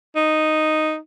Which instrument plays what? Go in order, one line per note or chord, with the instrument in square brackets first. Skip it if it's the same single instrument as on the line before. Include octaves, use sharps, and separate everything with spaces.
[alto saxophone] D#4